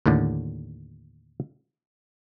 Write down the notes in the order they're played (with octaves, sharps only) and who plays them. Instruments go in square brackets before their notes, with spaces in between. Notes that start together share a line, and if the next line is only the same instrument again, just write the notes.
[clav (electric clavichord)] D#2 A2 D3 D5